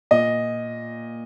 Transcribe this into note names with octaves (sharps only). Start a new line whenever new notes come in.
A#2 D#5